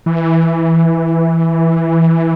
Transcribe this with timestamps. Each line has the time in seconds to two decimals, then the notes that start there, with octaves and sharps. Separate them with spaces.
0.06 E3